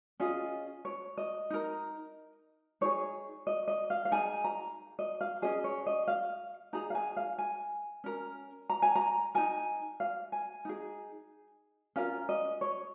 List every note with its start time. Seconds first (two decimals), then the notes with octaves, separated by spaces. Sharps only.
0.20 C#4 F4 G#4 D#5
0.85 C#5
1.18 D#5
1.50 D#4 A#4
2.81 D#4 G#4 C#5
3.47 D#5
3.68 D#5
3.90 F5
4.05 F5
4.11 D#4 G#4 G#5
4.44 A#5
4.99 D#5
5.21 F5
5.42 C#4 G#4 D#5
5.64 C#5
5.86 D#5
6.08 F5
6.73 D#4 G#4 A#5
6.90 F5
6.95 G#5
7.17 F5
7.39 G#5
8.04 C#4 A#4
8.70 A#5
8.82 G#5
8.95 A#5
9.35 D#4 A#4 G#5
10.00 F5
10.32 G#5
10.65 D#4 G#4
11.96 C#4 F4 A#4 F5
12.29 D#5
12.61 C#5